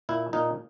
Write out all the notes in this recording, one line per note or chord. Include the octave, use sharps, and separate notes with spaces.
A#2 E4
A#2 D#4